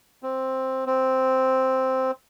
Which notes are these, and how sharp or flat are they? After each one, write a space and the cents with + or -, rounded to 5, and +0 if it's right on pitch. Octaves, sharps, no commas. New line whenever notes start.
C4 +5
C4 +0